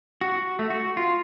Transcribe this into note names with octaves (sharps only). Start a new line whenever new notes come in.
F#4
A3
F#4
F4